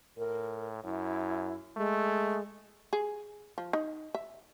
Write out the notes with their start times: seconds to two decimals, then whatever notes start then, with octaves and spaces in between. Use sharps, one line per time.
0.18 A2 A#4
0.84 F#2 E4
1.77 G#3 A3
2.93 G#4
3.58 F3
3.73 D#4
4.15 E5